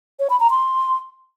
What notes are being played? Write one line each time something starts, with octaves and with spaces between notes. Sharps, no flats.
C#5
B5
A#5
C6